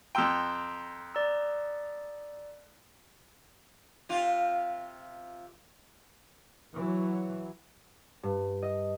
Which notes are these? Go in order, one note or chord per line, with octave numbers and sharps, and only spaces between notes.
F2 G5 A#5 C6 E6
D5 A#5 E6
C3 F4
E3 F#3
G2
D#5